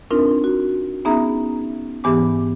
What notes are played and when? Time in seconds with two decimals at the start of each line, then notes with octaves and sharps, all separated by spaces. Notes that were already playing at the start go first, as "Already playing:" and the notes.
0.11 C4 D4 D#4 F4 A#4
0.44 F#4
1.05 B3 C#4 D#4 G#4 E5 A#5
2.04 G#2 E3 B3 G4 G#5 D6